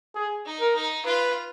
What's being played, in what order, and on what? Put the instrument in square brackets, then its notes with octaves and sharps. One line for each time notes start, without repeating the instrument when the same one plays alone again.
[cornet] G#4
[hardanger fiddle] D#4
[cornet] A#4
[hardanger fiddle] D#4
[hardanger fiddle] F4 [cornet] B4